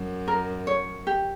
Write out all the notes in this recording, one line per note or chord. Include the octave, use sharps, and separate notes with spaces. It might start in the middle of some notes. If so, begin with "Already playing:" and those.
Already playing: F#2
A#4
C#5
G4